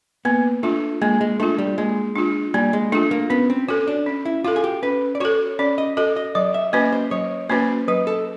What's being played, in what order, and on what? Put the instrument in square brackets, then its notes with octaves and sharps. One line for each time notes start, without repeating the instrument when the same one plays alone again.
[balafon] A#3 [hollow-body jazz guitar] B3
[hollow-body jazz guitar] A3 [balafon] D4 F4
[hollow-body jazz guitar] G#3 [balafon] A#3
[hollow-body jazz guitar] G#3
[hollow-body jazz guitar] A3 [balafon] D4 F4
[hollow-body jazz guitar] G3
[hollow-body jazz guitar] G#3 [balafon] A#3
[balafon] D4 F4
[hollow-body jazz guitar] G3 [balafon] A#3
[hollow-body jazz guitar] G#3
[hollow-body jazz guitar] A3 [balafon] D4 F4
[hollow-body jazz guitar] A#3
[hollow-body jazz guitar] B3 [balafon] C#4
[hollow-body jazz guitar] C4
[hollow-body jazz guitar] C#4 [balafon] F#4 A4
[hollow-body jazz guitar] D4
[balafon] C#4
[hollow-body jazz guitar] E4
[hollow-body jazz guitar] F4 [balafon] F#4 A4
[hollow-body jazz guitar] G#4
G4
[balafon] C#4 [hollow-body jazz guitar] B4
[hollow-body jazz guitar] D5
[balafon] F#4 A4 [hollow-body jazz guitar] C#5
[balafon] C#4 [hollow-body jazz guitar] D5
[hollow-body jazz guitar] D#5
[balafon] F#4 A4 [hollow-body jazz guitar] D#5
[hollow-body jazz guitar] D#5
[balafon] F#3 [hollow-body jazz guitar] D5
[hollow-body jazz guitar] E5
[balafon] A#3 C#4 F#4 B4 [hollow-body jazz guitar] D#5
[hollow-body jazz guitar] C5
[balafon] F#3 [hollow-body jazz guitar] C#5
[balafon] A#3 C#4 F#4 B4 [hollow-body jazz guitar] C5
[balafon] F#3 [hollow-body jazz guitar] B4
[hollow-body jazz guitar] A4